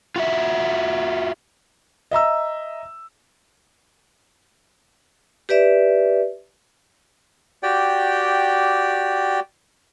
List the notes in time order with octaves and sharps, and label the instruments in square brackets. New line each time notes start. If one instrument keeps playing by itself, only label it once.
[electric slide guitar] F4 F#4 E5
[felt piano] D#5 E5 A#5 E6
[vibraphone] G4 B4 D5 E5
[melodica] F#4 G4 D5 G5